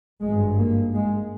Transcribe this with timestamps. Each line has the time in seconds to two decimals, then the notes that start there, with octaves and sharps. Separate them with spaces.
0.21 G#1 G2 G#3
0.58 A#3
0.94 G#3